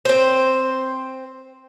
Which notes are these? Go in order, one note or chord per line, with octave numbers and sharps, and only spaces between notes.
C4 C5